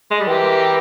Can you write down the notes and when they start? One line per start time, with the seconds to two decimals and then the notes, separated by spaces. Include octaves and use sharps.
0.11 G#3
0.20 G3
0.27 E3 G4 A#4